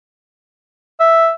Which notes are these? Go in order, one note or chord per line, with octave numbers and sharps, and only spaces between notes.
E5